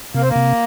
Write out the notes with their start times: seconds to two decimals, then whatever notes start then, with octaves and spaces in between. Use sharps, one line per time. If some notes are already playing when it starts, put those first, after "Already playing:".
0.14 C3 A#3
0.22 C4
0.29 A#3
0.35 C3